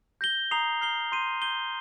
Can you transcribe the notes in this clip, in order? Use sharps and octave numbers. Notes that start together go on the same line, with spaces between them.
G6 A#6 G7
A#5 D#6 C7 F7
F6 C7 G7
C6 G6 C7 D#7
G6 D#7 G7